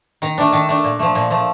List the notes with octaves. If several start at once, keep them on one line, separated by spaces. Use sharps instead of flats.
D#3 A#5
A3 D4
D#3 A5
A3 D4
A#2
F3 A3
A#2
F3 A3